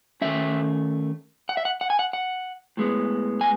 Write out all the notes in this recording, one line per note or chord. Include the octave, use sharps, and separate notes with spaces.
D#3 A3 C#4 E5
F#5
E5
F#5
F#5
G#5
F#5
F#5
A2 G#3 B3
G#5